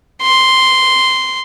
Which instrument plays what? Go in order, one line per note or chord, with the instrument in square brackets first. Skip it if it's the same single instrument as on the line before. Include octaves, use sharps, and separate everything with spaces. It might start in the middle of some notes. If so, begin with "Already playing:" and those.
[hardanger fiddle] C6